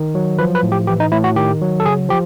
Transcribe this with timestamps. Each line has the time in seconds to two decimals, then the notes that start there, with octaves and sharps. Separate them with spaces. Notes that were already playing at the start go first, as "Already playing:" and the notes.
Already playing: D#3
0.15 F#3
0.39 F3 B4
0.55 B4
0.63 A2
0.72 G4
0.87 E3 G4
1.00 D#4
1.12 A2 E4
1.24 F#4
1.36 D#3 G4
1.61 F#3
1.80 A4
1.86 C#3 G#4
2.09 F3 G4